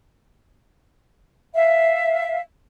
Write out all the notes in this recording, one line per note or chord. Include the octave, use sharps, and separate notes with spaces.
E5 F5